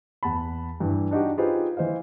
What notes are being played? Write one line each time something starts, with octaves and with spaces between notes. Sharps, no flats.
E2 F#5 A5 B5
G2 E3
D4 D#4 F#4 G4
D#4 F4 G4 G#4 B4 C5
E3 C5 D#5 F5